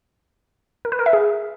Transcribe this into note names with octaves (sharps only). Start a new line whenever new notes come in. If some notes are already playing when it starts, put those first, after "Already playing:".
A#4
B4
A#4
E5
G#4